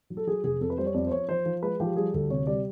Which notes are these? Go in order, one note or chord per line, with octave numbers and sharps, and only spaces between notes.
F#3
A4
F#3 G#4
F1 G#4
F2 A4
B4
G3 C5
C#5
F2 D5
C5
F2 C#5
F3 C5
F3
G#3 B4
F3 G4
G3 G#4
D2 A4
C3 C#5
G3 D5